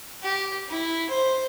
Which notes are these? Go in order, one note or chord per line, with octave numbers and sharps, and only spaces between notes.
G4
E4
C5